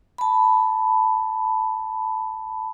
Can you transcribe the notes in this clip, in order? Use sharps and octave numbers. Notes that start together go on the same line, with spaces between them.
A5 B5